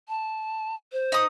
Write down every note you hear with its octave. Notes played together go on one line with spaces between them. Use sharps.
A5
C5
D#4 D#6